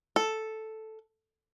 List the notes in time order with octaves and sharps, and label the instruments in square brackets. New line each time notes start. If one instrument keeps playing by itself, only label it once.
[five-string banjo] A4